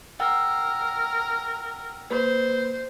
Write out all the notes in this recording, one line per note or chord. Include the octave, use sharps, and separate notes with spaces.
A#4 F#5 G5 E6
A#3 B4 C5